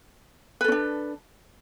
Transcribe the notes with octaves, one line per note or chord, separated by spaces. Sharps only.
C#4 D4 A4 B4